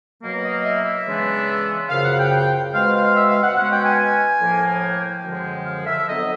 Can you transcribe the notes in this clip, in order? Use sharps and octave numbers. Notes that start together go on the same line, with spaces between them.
B2 F#3 A#3
D#5
E5
E5
C#3 E3 G#3 B3 D4
F#2 C#3 F3 F5
F#5
G5
G5
B2 G#3 C4 F5
F5
E5
F5
F#5
B2 G#3 C#4 F#5
G5
G#5
G#5
A2 F3 A#3
G5
F#2 D3 F3 G#3
F5
E5
F2 D3 F#3 B3 D#5